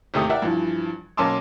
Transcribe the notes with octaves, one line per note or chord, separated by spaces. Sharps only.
G#1 D#2 C3 A3 G4 D#6
A#4 D5 E5 F#5 G5
G2 E3 F3
B1 A#3 C#4 A5 C6 D6